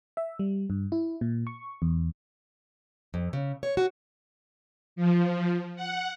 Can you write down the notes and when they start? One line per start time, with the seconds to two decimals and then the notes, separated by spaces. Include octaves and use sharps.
0.17 E5
0.39 G3
0.70 G2
0.92 E4
1.21 A#2
1.47 C#6
1.82 E2
3.14 F2
3.33 C#3
3.63 C#5
3.77 F#4
4.96 F3
5.76 F#5